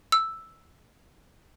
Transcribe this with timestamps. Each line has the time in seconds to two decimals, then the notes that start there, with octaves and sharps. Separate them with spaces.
0.12 E6